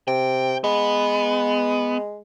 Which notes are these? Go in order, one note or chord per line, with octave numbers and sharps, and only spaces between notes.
C3 G5
G#3 B3